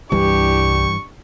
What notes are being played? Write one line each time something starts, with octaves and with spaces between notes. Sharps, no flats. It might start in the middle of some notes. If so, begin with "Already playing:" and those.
C2 G2 E3 D4 G4 C#6